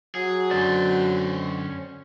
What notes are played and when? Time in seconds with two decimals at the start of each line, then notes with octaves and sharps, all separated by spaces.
0.15 F#3 G#4
0.51 F#2 D3 C#4 C5 D5